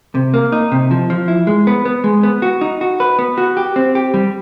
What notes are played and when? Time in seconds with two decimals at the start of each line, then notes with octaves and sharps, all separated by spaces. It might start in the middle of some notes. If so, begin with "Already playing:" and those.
0.15 C3
0.34 A#3
0.52 D#4
0.72 C3
0.91 F3
1.10 F3
1.28 E4
1.47 G#3
1.67 B3
1.85 B3
2.04 G#3
2.23 B3
2.42 F#4
2.61 D#4
2.81 F#4
3.00 B4
3.19 B3
3.38 F#4
3.57 G4
3.76 C4
3.95 G4
4.14 G3